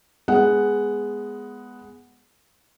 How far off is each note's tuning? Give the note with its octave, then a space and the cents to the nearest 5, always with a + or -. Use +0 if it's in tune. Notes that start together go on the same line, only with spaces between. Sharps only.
G#3 +0 B3 +0 F#5 +0